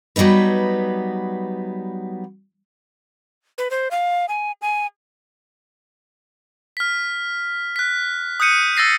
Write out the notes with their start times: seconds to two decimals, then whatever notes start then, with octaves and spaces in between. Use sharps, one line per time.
0.16 F#3 G3 B3 D#4 B4
3.58 B4
3.71 C5
3.91 F5
4.29 G#5
4.62 G#5
6.77 F6 B6
7.76 F#6 B6
8.40 D#6 F#6 G6 C#7 D#7
8.76 E6 A6 A#6 C7 D#7